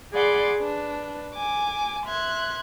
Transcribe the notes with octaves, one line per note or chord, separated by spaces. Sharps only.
G#4 D5 F#5 B5 C6 D6
D4 B4
G#5 D6
E5 C6 F#6 G#6